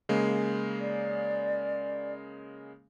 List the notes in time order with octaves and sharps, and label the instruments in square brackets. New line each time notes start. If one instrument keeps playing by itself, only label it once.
[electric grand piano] C#3 G#3 A#3
[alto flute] D5